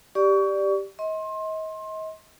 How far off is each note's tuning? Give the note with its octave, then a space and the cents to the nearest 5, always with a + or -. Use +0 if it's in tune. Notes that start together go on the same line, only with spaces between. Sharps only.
G4 +0 D5 +0 C#6 +30
D#5 +35 C6 +25